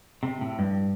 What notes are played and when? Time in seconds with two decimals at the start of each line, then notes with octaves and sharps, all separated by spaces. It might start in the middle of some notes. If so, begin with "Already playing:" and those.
0.23 C3
0.41 A2
0.59 G2